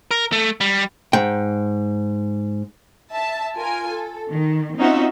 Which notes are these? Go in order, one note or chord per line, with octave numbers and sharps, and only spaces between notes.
A#4
A3
G3
G#2 G5
E5 A5
F4 A#4 G#5
A4
D#3
C4 C#4 D#4 F4 F#4 E5